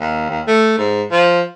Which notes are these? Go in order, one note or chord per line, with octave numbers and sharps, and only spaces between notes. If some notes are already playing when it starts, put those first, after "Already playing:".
D#2
D#2
A3
G#2
F3